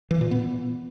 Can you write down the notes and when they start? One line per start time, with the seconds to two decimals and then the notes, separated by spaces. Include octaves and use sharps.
0.11 E3
0.21 A#2
0.31 B3